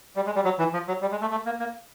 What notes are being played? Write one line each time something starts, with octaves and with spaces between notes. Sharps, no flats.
G3
G#3
G3
F#3
E3
F3
F#3
G3
G#3
A3
A3
A#3
A#3